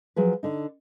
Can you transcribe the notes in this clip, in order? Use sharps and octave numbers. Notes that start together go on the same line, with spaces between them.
F3 F#3 G#4 B4
D3 D#4